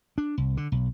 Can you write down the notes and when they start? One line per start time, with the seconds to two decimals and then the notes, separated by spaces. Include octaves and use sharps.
0.18 D4
0.38 C2
0.57 D3
0.72 B1